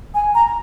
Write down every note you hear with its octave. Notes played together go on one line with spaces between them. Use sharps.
G#5
A#5